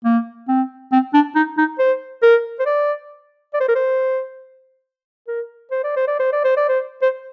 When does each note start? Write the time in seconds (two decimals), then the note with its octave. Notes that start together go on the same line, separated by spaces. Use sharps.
0.04 A#3
0.48 C4
0.92 C4
1.14 D4
1.35 D#4
1.58 D#4
1.79 C5
2.22 A#4
2.59 C5
2.66 D5
3.54 D5
3.60 C5
3.68 A#4
3.75 C5
5.28 A#4
5.71 C5
5.84 D5
5.96 C5
6.07 D5
6.19 C5
6.32 D5
6.45 C5
6.57 D5
6.69 C5
7.02 C5